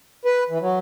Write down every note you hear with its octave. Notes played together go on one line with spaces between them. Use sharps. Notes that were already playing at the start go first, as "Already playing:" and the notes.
B4
E3
F#3